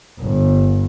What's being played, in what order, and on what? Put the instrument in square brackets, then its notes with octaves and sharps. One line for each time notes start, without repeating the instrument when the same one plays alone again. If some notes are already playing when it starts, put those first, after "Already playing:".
[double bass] G1